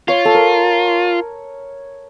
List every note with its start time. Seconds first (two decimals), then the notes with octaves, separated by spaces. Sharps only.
0.08 F4 C#5
0.25 A4
0.35 A#4